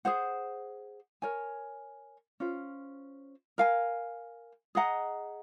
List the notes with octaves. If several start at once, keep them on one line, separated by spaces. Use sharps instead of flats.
G#4 C5 F#5
A#4 C#5 G#5
C#4 F4 C5
A#4 F5 G#5
G#4 D#5 F#5 A#5